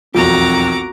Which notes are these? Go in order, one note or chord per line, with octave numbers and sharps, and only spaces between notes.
E1 B1 F2 C4 F4 F#4 A#5 D6